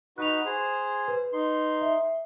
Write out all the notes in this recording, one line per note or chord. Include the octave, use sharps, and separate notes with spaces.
D#4 F#4 B4 F#6 F7
G#4 C5
B4
D#4 C6
E5